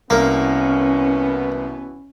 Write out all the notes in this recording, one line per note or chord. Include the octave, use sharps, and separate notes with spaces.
C2 B2 E3 A#3 B3 C#4 A#4